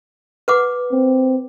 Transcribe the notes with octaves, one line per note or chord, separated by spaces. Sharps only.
B4 F#5 D6
C4